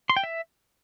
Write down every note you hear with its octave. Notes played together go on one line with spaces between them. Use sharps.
C6
G5
E5